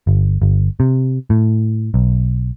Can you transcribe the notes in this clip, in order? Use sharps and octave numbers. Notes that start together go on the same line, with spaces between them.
G1
G1
C3
A2
B1